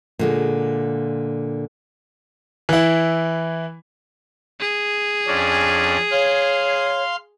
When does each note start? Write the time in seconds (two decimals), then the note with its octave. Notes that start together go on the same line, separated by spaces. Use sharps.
0.19 A#2 D3 G#3
2.69 E3 E4
4.60 G#4
5.27 F2 C#4 D4
6.12 C#5 F5 C6